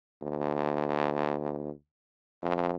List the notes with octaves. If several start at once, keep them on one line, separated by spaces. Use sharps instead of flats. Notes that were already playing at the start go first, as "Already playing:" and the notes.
D2
F2